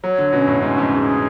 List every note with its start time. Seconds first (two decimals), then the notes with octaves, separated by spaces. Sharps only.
0.03 F#3 C#5
0.18 D3
0.33 B2 C#4
0.48 A2
0.62 G#2 C#4
0.78 F2
0.93 G#4